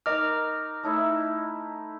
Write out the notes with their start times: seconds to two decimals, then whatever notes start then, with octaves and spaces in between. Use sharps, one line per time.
0.06 D#4 A#4 D#5 D6 F6
0.83 A3 D#4 E4